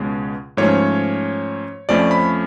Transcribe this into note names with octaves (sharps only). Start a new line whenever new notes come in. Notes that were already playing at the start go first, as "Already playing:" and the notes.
Already playing: C#2 B2 G#3 C#4
G#2 F3 A3 C#4 C#5
F2 F3 A3 C#4 D5
B5